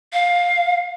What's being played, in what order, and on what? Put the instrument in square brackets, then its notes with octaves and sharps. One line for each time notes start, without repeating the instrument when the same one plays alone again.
[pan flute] F5